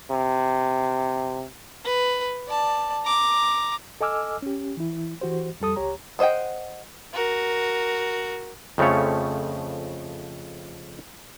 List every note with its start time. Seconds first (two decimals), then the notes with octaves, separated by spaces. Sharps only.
0.11 C3
1.84 B4
2.48 D5 A5
3.05 A#5 D6
4.01 A4 D#5 G#5 D6 E6 F6
4.42 C#4 G4
4.77 E3 E4
5.21 E3 F#4 G4 C5
5.60 F2 G3 A4 D#6
5.76 C#2 G4 C#5 A#5
6.19 B3 C5 D#5 F#5 G5
7.14 F#4 A#4
8.78 F2 C#3 F3 A3 C#5